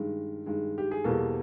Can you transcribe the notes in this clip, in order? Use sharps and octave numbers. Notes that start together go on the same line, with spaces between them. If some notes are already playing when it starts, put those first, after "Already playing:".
Already playing: G2 D#3 G#3
G2 D#3 G#3
G4
G#4
E2 B2 G3 A#3 A4